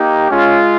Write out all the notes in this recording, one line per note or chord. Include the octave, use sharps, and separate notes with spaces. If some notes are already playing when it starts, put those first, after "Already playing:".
Already playing: A#3 D#4 G4
G#3 C#4 F4